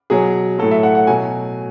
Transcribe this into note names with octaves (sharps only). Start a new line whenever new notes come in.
B2 F#3 G#4
A2 F#3 A4
E5
F#5
F#5
B2 F#3 G#5